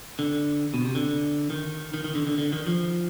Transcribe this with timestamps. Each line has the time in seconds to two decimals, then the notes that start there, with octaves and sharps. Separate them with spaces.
0.19 D3
0.74 B2
0.85 C3
0.95 D3
1.50 D#3
1.94 D#3
2.04 D#3
2.15 D3
2.27 D3
2.38 D3
2.53 D#3
2.67 F3